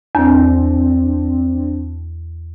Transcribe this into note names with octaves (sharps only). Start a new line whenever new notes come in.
E2 C4 D4